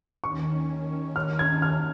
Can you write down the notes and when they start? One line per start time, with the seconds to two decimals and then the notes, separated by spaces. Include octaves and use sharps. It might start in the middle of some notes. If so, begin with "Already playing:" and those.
0.24 D#2 D#3 C#4 C#6
1.16 F6
1.39 G#6
1.62 F6